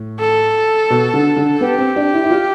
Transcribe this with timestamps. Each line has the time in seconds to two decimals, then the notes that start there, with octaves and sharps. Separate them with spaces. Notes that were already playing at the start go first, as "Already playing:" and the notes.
Already playing: A2
0.20 A4
0.90 B2
1.14 D3
1.36 D3
1.60 B3 G4
1.79 C4
1.96 D4
2.14 E4
2.24 E4
2.31 F4